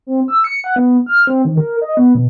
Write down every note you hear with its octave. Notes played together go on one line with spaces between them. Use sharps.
C4
E6
C#7
F#5
B3
F6
C4
D#3
A#4
D#5
B3
B2